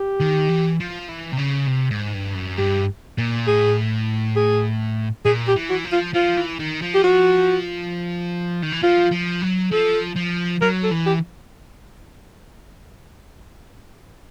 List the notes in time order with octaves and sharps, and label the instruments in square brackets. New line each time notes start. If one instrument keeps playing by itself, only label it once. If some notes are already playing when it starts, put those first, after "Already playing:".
Already playing: [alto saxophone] G4
[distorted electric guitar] D#3
E3
F3
E3
C3
C#3
C3
G#2
G2
F#2
[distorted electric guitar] G2 [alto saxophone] G4
[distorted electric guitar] A#2
[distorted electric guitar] A2 [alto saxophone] G#4
[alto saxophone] G#4
[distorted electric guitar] A#2 [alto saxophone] G#4
[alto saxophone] G4
[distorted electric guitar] E3
[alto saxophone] F#4
[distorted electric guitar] F3
[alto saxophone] F4
[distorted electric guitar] F3 [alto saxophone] F4
[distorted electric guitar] E3
D#3
F3
[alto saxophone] G4
F#4
[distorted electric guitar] D#3
E3
[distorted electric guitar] F3 [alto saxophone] F4
[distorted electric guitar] F3
F#3
[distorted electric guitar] F3 [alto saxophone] A4
[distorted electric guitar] F3
[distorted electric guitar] F#3 [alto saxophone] A#4
[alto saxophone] A4
[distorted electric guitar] E3
[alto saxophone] G4